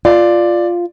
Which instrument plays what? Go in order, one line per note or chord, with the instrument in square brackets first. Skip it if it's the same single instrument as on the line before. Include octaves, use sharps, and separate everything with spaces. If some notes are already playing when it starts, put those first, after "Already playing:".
[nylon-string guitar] F4 [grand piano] D5